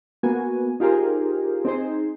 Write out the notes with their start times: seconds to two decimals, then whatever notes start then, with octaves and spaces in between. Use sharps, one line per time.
0.23 A#3 B3 F#4 G#5
0.80 D#4 F4 G4 G#4 A#4 C5
1.65 C4 D#4 G#4 C5